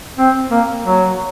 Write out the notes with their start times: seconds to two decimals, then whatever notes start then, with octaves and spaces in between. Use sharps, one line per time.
0.18 C4
0.51 A#3
0.84 F#3